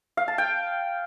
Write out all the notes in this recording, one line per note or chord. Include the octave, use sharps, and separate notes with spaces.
F5
A5
G5